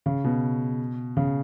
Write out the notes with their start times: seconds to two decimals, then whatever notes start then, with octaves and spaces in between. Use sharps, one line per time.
0.06 C#3
0.24 B2
1.17 C#3